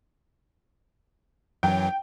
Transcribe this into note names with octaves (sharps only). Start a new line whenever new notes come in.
F#2 E3 F#3 G5